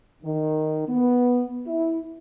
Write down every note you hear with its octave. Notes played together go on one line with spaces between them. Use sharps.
D#3
B3
E4